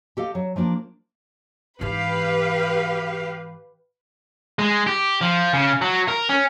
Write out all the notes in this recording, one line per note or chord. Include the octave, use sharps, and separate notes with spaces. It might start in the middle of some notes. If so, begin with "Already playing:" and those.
G4 A4 D#5 F5
F#3
F3 A#3 D4 F4
G#2 E3 G4 B4 F5
G#3
G4
F3
C#3
F#3
A#4
C#4